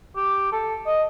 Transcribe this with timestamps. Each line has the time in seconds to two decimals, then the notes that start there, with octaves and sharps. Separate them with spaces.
0.16 G4
0.52 A4
0.87 D#5